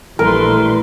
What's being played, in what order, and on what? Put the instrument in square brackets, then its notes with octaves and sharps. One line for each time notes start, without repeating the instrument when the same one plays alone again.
[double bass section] A#1 G3 [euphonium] E3 [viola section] A3 B4 C6 [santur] A#4